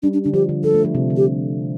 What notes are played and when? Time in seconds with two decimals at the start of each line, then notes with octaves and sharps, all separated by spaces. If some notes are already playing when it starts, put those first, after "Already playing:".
0.03 G3 D4
0.13 D4
0.24 D3 D4
0.33 F3 G4
0.49 D3
0.64 F3 A4
0.74 A3
0.85 F3
0.95 C3
1.10 D3
1.17 G4